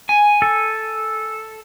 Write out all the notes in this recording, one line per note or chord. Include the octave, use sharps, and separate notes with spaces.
G#5
A4